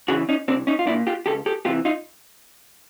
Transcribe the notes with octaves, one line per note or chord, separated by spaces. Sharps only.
C#3 E3 F#4 G#4
C#4 D#4
C2 C4 D4
C#4 D#4
F4
A#2 D4 E4
F4 G4
C#2 G4 A4
G4 A4
C3 E3 F4 G4
D#4 F4